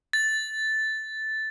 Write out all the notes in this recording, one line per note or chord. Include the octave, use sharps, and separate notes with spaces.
A6